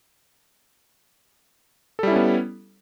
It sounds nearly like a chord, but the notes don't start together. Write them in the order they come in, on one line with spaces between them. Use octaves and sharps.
A4 G3 E4 C#4 B3